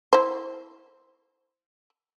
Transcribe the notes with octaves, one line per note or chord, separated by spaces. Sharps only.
E4 C5